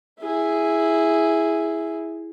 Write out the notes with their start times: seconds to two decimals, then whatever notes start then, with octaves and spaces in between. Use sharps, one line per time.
0.20 E4 G#4